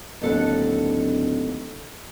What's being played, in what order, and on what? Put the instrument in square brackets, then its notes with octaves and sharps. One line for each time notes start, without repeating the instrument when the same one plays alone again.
[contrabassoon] D1 [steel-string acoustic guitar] D#2 A4 F#5